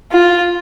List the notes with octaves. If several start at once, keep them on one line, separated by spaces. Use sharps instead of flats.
F4